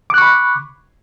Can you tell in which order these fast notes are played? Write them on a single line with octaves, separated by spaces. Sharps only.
D6 F#6 C#6 B5